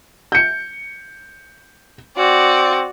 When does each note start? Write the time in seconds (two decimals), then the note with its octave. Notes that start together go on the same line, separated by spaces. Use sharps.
0.32 G6 C#7
2.17 C4 F#4 D5